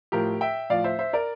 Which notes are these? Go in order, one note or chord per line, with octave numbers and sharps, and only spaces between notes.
A2 F3 G4 A#4
E5 G5
A2 F3 D5 F5
C5 E5
C5 E5
A#4 D5